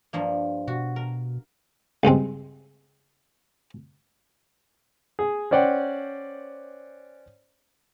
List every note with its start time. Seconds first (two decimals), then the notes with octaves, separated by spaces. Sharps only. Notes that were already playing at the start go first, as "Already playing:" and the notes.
0.13 G2 F3 A#3
0.68 B2 F#4
0.96 A#4
2.03 C#2 G2 G#3 C4
5.19 G#4
5.51 C#4 C5 D5 F#5 G5